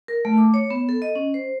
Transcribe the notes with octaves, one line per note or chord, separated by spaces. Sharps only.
A#4
A3
D6
C#5
B3
A4
D#5
C#4
C5